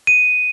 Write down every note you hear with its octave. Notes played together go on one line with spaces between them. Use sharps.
D#7